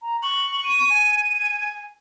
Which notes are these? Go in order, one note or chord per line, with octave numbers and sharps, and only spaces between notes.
A#5
C#6 F#7
D#7
G#5